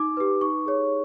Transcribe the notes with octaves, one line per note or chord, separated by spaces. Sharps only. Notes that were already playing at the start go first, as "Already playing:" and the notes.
Already playing: D#4 D6
G4 B4
D#4 C#6
G#4 C#5